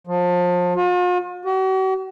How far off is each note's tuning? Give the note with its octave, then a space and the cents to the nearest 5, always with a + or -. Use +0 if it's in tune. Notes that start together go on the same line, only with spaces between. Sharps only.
F3 +30
F4 +45
F#4 +45